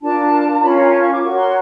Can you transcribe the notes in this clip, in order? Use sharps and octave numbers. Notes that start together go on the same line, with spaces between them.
D4 F4 A#4 A5
C#4 F4 A#4 C#5 B5
A#5
G#5
A5
C#6
D6
F#4 A#4 C#5 C#6
C6